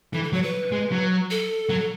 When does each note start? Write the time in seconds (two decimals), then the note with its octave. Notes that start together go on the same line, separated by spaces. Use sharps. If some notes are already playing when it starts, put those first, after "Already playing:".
0.13 E3 A4
0.23 A4
0.33 F#3 C#5
0.43 B4
0.72 G#3
0.92 F#3
1.31 A4
1.70 F#3